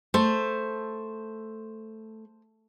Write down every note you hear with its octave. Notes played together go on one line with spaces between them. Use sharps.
A3 C5